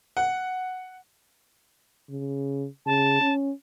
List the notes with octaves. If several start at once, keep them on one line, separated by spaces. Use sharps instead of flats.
F#5
C#3
C#3 A5
C#4